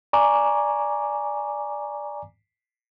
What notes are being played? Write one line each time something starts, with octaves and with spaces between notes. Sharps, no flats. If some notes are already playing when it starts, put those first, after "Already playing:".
D5 G#5 A#5 C#6 D6